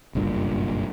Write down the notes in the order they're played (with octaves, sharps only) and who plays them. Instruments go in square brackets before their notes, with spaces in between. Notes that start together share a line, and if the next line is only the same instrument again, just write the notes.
[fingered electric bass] F#1 B1 G2 A#2